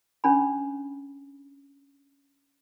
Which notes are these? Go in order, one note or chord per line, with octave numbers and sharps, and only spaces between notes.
C#4 D4 B5